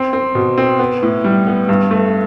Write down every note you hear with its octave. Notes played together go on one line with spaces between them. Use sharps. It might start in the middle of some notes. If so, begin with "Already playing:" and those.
Already playing: C4
C4
B2
C4
B3
A2
G3
B3
G2
A3